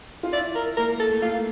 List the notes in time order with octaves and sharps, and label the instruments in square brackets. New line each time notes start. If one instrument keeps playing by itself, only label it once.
[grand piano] F4
[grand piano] E4 [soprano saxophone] D5
[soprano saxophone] A#4
[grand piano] A#3 [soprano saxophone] A#4
[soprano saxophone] A4
[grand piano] A3
[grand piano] A#3 [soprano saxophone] F4